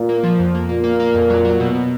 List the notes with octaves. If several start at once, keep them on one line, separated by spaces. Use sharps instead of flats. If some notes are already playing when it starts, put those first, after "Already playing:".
Already playing: A#2
A#3
F3
F2
A#3
A#2 A#3
A#3
A#3
F2
F#3
F#3
B2
B2